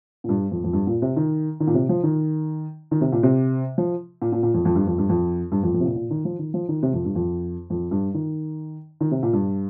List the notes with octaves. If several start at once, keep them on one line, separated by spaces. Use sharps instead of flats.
A#2
G2
F2
F2
G2
A#2
C3
D#3
D#3
A#2
C3
F3
D#3
D#3
C3
A#2
C3
F3
A#2
A#2
A#2
F2
F2
G2
F2
G2
F2
G2
F2
F2
C3
A#2
A#2
D#3
F3
D#3
F3
D#3
C3
F2
G2
F2
F2
G2
D#3
D#3
C3
A#2
G2